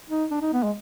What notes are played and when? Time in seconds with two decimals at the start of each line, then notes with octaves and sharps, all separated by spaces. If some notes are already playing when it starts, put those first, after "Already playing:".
0.09 D#4
0.31 D4
0.42 D#4
0.53 B3
0.63 G#3